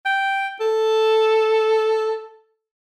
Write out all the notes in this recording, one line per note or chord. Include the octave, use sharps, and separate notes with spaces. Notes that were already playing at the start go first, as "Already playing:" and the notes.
G5
A4